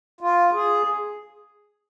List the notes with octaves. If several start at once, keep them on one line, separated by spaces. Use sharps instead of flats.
F4
G#4